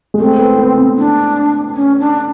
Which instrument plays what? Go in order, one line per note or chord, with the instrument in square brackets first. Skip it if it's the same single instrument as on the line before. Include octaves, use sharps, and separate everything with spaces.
[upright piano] G#3
[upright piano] A3 [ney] C4
[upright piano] B3
B3
C4
[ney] D4
C#4
D4